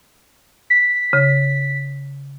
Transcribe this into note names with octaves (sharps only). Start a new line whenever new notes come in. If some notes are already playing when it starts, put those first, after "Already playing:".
B6
C#3